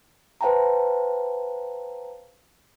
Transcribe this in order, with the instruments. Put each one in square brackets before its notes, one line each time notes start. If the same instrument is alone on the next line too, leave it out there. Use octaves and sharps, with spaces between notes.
[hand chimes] B4 C5 F5 G5 A5 A#5